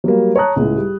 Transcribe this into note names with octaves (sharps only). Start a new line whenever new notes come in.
F#3 G3 A#3
C#5 A5 A#5 D#6 F#6
C#2 A2
G3